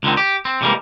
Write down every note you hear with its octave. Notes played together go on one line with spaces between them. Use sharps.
C#2 D3 D#3 C4
G4
C4
A2 C3 E3 G3 G#3 A#3